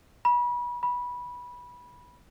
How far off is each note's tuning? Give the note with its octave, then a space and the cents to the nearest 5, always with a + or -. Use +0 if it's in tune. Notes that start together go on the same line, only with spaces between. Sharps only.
B5 -30
B5 -15